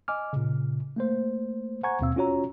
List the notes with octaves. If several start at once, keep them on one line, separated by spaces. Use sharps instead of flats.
D#5 G#5 D6 F6
A#2 C#3
A3 A#3 C5
C5 F#5 G#5 A#5 C#6 G#6
D#2 B2 C4 F5 E6
C#4 F4 F#4 C#5 A#5